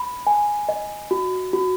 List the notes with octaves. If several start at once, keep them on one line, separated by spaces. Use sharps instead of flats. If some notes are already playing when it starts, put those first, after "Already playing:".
Already playing: B5
G#5
D#5
F#4
F#4